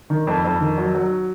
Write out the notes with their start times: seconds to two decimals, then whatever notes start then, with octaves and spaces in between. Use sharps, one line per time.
0.10 D#3
0.27 F2
0.44 F2
0.61 D#3
0.78 F#3
0.95 F#3